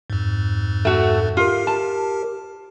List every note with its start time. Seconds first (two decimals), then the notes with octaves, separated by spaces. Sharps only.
0.10 F2 G#2
0.85 A3 F#4
1.37 F4 G4 A#4
1.67 A5